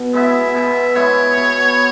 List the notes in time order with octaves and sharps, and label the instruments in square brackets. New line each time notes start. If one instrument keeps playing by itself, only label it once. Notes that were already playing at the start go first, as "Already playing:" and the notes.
Already playing: [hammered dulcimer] B2
[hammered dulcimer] G#3 B3 E4 [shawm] E5
[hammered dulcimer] B2 [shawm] E5
[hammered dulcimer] G#3 B3 E4 [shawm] C#5
[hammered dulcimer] B2